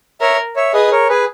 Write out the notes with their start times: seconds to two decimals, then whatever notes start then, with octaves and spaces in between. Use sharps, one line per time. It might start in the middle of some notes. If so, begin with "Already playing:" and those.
0.21 A#4 C#5 E5
0.56 C#5 E5
0.73 G#4 B4 D#5
0.92 A#4 C#5
1.09 G#4 B4